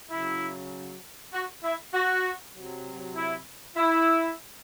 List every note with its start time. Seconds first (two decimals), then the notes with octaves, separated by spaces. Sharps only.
0.10 C#3 F#3 E4
1.33 F#4
1.63 E4
1.94 F#4
2.54 C3 F#3
3.15 E4
3.77 E4